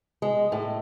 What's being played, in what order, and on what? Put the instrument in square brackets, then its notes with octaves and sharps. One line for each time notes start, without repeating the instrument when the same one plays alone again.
[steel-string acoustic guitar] G#3
A2